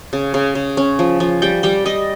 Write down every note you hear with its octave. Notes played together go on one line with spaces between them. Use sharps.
C#3
C#3
C#3
C#4
F3
F3
G3 G5
G3 G5
G3 D#5